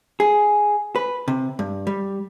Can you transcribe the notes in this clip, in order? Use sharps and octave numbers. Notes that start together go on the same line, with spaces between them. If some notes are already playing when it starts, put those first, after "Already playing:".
G#4
B4
C3
G2
G3